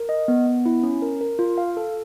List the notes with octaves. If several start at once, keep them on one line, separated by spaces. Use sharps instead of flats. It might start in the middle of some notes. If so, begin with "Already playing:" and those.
Already playing: A#4
D#5
B3
B3
E4
C#4
A#4
A#4
F4
F5
A4